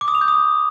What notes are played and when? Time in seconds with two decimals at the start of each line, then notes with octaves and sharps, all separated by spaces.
0.01 D6
0.08 D#6
0.15 F7
0.21 G6
0.28 D#6